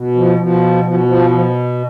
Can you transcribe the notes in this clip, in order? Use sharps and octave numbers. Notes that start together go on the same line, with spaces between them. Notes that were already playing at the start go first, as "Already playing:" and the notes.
Already playing: B2
F3
B2 F3
B2 F3
F3
F3